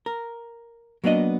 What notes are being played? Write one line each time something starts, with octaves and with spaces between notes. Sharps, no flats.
A#4
F#3 A#3 B3 D4 D#5